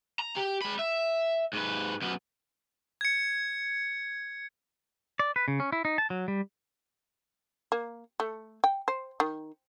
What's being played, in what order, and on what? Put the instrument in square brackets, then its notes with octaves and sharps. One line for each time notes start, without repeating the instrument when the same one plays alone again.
[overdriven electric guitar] A#5
G4
G#3 B5
E5
G#2 B4
F#2 B3
[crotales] G#6 C#7
[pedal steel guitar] D5
B4
C#3
C#4
E4
D#4
A5
F#3
G3
[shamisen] A#3
A3
G5
C5
D#3